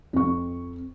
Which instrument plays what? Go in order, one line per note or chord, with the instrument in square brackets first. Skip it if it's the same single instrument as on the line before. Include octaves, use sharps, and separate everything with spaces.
[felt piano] F2 C#6